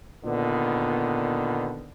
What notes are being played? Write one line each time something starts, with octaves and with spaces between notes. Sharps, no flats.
A#2 D3 D#3 B3